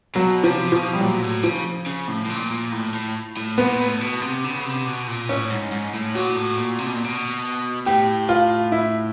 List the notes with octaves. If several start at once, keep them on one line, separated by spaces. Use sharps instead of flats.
B2 F#3
C3 F3
B2 F3
G3
A#2 F#3
A2
C#3 F3
C#3
A2
A2
A#2
A#2
A2
A2
A2
A#2 B3
A2
B2
C3
C#3
C3
B2
A#2
A2 C#4
G#2
G#2
A2
A#2 F#4
A2
A#2
C3
B2
A#2
B2
A2 G4
F4
E4